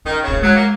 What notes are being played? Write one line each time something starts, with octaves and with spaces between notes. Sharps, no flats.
D#3 C#4
C#3 B3
A#3
F#3 G#3
A#3